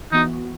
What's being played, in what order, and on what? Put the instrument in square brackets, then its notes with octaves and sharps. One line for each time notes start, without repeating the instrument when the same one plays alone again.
[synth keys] E3 B3 F#4 [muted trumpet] D#4